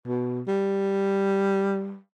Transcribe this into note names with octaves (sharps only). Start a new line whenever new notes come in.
B2
G3